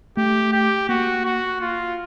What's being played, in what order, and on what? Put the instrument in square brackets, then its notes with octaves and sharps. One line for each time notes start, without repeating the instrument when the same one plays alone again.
[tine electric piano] A3 [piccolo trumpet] G4
[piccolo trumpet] G4
[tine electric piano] A#3 [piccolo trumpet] F#4
[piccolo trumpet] F#4
F4